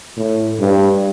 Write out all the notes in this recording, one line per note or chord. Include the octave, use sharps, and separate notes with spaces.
A2
G2